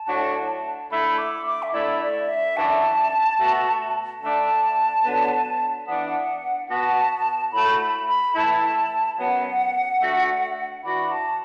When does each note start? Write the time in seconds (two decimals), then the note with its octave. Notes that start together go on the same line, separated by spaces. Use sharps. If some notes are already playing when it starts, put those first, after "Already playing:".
Already playing: A5
0.08 A2 F#3 D4 F#4
0.90 D3 A3 E4 B5
1.18 D6
1.46 D6
1.63 E5
1.74 D3 A3 E4 D5
2.01 D5
2.29 E5
2.56 F#2 E3 D4 F#4 A5
3.39 B2 A3 F#4
4.22 D3 A3 D4 A5
5.05 D3 F#3 B3 D4
5.87 E3 B3 D4 F#5
6.70 B2 B3 F#4 A5
7.52 A2 A3 F#4 B5
7.80 B5
8.07 B5
8.35 E3 A3 E4 A5
9.18 F#2 F#3 B3 F#5
10.00 D3 A3 F#4
10.84 E3 D4 F#4 B5
11.11 A5